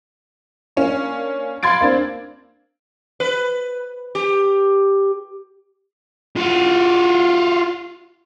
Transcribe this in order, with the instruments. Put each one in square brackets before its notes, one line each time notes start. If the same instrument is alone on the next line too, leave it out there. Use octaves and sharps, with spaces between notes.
[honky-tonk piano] A#3 C#4 D4
F5 B5 C6 G#6 A6 D7
A#3 C4 D4
[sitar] B4
G4
[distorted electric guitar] F4 F#4